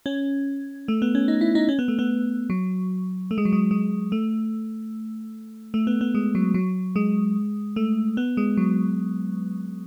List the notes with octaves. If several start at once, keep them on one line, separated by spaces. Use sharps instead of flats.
C#4
A3
B3
C#4
D#4
E4
D#4
C#4
B3
A3
B3
F#3
A3
G#3
F#3
G#3
G#3
A3
A3
B3
B3
G#3
F#3
F#3
G#3
A3
B3
G#3
F#3